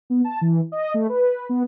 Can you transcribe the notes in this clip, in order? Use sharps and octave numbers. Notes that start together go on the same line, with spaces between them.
B3
A5
E3
D#5
A3
B4
B3